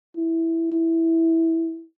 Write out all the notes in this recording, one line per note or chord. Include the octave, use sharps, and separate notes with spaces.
E4
E4